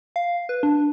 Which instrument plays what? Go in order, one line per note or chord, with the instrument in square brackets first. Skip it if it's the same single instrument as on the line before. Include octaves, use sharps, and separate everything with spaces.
[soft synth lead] F5
B4
D4